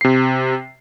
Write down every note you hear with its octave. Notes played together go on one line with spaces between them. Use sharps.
C3 C7